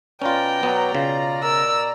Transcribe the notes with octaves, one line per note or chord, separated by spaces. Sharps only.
B2 C#4 F4 B4 D5 G5 A#5
F#3 B3
C#3 F4
A#4 E6